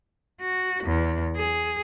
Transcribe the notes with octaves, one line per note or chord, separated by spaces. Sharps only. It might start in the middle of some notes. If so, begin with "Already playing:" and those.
F#4
E2
G#4